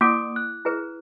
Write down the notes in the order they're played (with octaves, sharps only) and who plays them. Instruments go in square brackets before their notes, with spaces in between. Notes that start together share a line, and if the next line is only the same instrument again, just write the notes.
[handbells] A#3 D#6 D7 [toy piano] E4 F#5 D6
[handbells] F#6
[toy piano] E4 G#4 B4